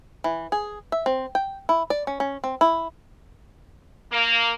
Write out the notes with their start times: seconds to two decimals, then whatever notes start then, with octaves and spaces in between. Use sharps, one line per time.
0.24 E3
0.52 G#4
0.92 E5
1.06 C4
1.35 G5
1.69 E4
1.90 D5
2.07 C#4
2.20 C#4
2.44 C4
2.61 E4
4.12 A#3